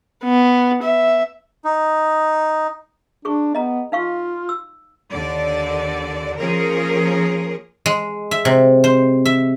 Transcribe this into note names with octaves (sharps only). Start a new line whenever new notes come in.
B3
E5
D#4
D4 G#4 C#6
B3 D#5 A#5
D#4 F4 F5 C#6
E6
D#2 D3 D5
F3 A#3 C#4 G#4 A#4
G#3
E5
C3
C5
E5